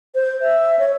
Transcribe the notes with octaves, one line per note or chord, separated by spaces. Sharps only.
C5
E5
C#5